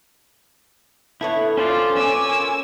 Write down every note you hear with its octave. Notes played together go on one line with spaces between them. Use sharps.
D3 B3 E4 C#5
C#4 F4 C5 D5
C#4 G#5 D6 E6
A#3 B3 F4